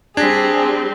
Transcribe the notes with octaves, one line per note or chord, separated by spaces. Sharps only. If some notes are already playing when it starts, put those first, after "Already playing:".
G3 C4 D4 G#4 G#6 A#6 B6